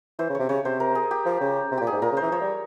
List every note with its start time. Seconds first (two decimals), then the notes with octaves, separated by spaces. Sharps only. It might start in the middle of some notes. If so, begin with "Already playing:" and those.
0.19 E3 C5
0.29 C#3
0.35 C3 C#5
0.49 C#3 C#5
0.65 C3 C5
0.80 A#4
0.95 G#4
1.11 G4
1.26 F3
1.41 C#3
1.71 C3
1.77 A#2 G4
1.87 G#4
1.92 G#2
2.02 A#2 A#4
2.12 C#3
2.17 C5
2.22 E3
2.32 F3 C#5
2.42 G3